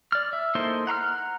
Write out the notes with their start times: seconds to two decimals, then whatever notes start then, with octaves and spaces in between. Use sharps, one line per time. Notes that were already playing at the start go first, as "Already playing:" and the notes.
0.12 D5 F6
0.33 E5
0.55 A#3 D#4 E4 A4 C5
0.87 F#5 A#5 C6 F6